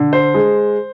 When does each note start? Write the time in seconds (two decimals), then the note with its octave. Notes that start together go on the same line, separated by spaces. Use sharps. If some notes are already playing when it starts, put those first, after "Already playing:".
Already playing: D3
0.13 C5
0.34 G#3